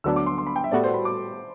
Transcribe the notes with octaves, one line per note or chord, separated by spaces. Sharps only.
D2 D3 F#3 B3 D4 E6
D6
C6
C6
B5
G5
E5
A2 G3 B3 F#4 A4 D5
C5
B5
D6